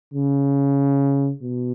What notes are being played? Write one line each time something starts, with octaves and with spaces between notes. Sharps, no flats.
C#3
B2